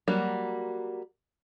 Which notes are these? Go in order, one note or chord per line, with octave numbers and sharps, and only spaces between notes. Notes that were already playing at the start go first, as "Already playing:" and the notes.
F#3 G3 A#3 F#4